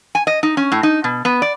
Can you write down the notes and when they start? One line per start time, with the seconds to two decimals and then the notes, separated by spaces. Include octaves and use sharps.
0.15 G#5
0.27 D#5
0.43 D#4
0.57 C#4
0.72 A2
0.83 D#4
1.04 B2
1.25 B3
1.42 D5